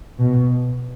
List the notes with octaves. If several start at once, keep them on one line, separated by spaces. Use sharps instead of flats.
B2